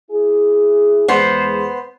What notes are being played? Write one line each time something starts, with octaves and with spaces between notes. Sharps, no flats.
E4 G#4
E2 G#3 B3 C5